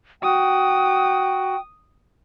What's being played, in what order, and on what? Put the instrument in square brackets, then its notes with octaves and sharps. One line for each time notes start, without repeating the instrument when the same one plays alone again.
[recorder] F#4 [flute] G5 [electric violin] D#6